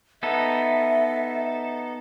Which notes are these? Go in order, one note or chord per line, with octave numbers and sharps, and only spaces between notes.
B3 D#4 A4 E5